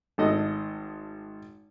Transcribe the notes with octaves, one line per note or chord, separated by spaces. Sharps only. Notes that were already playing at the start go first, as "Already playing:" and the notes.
G#1 A3 D#5